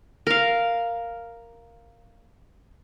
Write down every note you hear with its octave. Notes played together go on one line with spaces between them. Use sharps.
A#4 F5